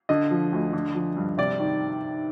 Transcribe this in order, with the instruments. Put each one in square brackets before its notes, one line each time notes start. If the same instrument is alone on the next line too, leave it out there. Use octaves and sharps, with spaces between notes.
[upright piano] D3 D#5
F3
D2
D3
F3
G2
C3 D5
D#3